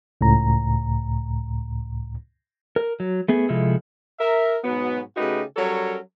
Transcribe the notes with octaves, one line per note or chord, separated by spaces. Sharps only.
C#2 A2 A#5
A#4
F#3
A3 B3 G#4
C3 F3 G#3 E4 A4
A#4 E5
G#2 B2 F#3 B3
C#3 A3 D#4 F#4 G4 B4
F#3 G3 C#4 A4 A#4 C#5